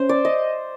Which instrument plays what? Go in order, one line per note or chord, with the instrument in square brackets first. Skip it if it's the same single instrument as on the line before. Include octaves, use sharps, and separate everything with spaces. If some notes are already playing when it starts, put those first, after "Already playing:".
Already playing: [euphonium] C#4 [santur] C5
[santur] D5
D#5